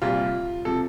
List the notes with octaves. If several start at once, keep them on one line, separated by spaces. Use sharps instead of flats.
C2 A#2 G3 F4
C3 F3 A4